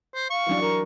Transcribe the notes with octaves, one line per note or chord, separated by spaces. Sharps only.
C5
F5 C#6
E3 F#3 D4
A#4